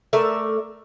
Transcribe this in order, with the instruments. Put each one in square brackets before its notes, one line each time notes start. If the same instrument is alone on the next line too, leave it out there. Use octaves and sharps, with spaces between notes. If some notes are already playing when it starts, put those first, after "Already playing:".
[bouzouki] A3 A#4 D5 E5